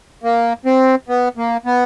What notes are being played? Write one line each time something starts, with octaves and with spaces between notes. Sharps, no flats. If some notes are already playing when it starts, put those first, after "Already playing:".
A#3
C4
B3
A#3
B3